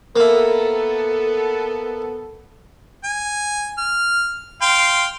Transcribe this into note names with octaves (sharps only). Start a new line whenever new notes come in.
A#3 B3 E4 A4
G#5
F6
F5 G5 C6